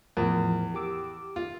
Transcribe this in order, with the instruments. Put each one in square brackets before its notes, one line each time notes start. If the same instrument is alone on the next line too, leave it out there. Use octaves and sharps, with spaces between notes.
[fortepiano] E2 [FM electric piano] A2 F3 A#4
[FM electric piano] G4 D6 E6
[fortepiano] F4